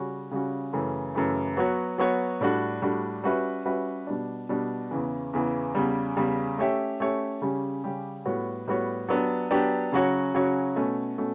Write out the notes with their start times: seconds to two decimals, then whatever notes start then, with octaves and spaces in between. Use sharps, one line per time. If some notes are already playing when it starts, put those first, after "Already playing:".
Already playing: C#3 G3 C#4 F#4
0.31 C#3 G3 C#4 F#4
0.73 F#2 C#3 E3 A3
1.15 F#2 C#3 E3 A3
1.57 F#3 B3 F#4 C#5
1.98 F#3 B3 F#4 C#5
2.41 A2 G3 D4 F#4
2.82 A2 G3 D4 F#4
3.24 G3 C#4 F#4 B4 E5
3.66 G3 C#4 F#4 B4 E5
4.07 B2 G3 D4
4.49 B2 G3 D4
4.91 E2 C#3 E3
5.33 E2 C#3 E3
5.75 E2 C#3 G3
6.17 E2 C#3 G3
6.58 A3 C#4 G4 C#5 E5
7.00 A3 C#4 G4 C#5 E5
7.42 C#3 G3 C#4 G4
7.84 C#3 G3 C#4 G4
8.25 A2 G3 B3 F#4 C#5
8.67 A2 G3 B3 F#4 C#5
9.09 F#3 B3 D4 G4
9.51 F#3 B3 D4 G4
9.92 C#3 F#3 C#4 F#4 C#5
10.35 C#3 F#3 C#4 F#4 C#5
10.76 B2 A3 C#4
11.18 B2 A3 C#4